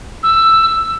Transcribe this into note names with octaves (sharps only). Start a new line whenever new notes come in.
E6